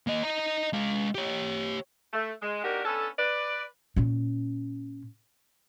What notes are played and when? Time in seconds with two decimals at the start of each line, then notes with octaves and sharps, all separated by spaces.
0.07 A#3 D#5
0.23 D#5 A#5
0.73 G#3 F5
1.15 G4 C#5
2.13 A3
2.41 G#3
2.63 A#3 D4 D#4 F#4 G4 A#4
2.85 B3 C#4 D4 A4
3.18 B4 D5
3.96 A#2 C#4